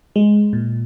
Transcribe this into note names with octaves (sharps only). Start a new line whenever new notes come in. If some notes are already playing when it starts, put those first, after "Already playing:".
G#3
A#2